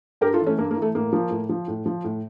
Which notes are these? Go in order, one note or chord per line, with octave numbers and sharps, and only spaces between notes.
G2 G4 A#4
F4 A4
E3
A3 C#4
G2 A#3
A#3
E3
A3
A2 A#3
F3
A2
F3
A2
F3
A2